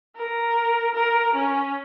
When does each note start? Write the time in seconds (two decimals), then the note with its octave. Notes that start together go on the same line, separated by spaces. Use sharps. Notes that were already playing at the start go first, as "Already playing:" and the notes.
0.16 A#4
0.95 A#4
1.35 C#4